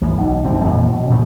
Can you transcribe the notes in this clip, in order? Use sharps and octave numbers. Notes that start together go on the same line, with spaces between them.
G1 D2 E3 F3
B1
G1 D#2 D3 C4
F2 A#2 E3 F#3
B2
A#2 C#3 F3 A3